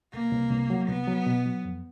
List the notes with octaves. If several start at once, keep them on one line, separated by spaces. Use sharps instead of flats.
C2 A#3
C2
C2
F#3
C2 B3
F#3
B2
F#3
F2